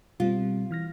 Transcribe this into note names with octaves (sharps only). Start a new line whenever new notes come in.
B2 G3 C4 F4
E3 F6 A#6